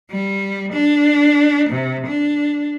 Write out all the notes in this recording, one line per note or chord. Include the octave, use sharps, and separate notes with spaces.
G3
D4
C3
D4